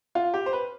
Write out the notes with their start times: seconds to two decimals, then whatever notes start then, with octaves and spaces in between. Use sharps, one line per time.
0.15 F4
0.34 G4
0.46 C5
0.53 B4